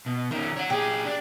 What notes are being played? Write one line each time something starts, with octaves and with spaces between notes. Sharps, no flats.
B2
D#3 C#4 A#4 E5
C#5 F#5
A#2 G4 G#4
D4